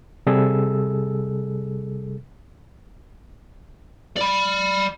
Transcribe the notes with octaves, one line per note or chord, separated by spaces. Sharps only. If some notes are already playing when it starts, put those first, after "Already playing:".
C3 G3 G#4 A4 E6
D5 B5